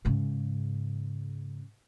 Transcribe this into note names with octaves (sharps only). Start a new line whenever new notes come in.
G#2 C#3